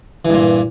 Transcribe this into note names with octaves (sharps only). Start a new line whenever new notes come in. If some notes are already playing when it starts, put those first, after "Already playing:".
G2 A#2 E3